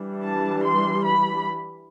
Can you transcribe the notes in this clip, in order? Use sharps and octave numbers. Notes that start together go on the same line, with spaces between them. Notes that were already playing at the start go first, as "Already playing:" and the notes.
Already playing: E3 G3 D4
A5
C6
B5